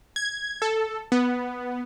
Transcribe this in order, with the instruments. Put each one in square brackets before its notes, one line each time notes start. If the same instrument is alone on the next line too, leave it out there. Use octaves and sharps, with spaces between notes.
[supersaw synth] G#6
A4
B3